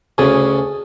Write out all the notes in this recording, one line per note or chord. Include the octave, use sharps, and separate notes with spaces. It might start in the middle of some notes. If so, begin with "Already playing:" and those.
D2 C#3 G#4 A5